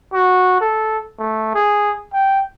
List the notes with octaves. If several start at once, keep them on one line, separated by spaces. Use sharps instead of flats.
F#4
A4
A3
G#4
G5